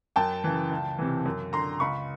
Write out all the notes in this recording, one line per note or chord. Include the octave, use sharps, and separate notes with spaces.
F#2 G5 A5
C#3 E3
C#2
C3 E3
F#2
D3 A#5 C6
C#2 B5 C#6